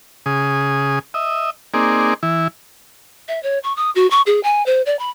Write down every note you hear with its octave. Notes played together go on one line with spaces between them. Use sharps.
C#3 G#4 D#6
D#5 E5
A#3 C4 D#4 G#4 D5
E3 E4
E5
C#5
C#6
D#6
F#4
C#6
G#4
G#5
C5
D5
B5